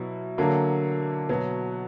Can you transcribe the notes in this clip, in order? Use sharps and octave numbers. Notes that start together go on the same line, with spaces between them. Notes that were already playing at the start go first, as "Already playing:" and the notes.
Already playing: B2 F#3 E4
D3 F#3 A#3
B2 F#3 B3